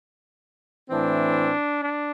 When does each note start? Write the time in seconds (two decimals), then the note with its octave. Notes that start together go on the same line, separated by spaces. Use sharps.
0.90 A2 E3 C4 D4
1.82 D4